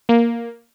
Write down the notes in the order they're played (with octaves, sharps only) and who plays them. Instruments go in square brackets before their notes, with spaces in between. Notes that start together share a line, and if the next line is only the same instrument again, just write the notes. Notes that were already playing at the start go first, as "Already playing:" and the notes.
[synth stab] A#3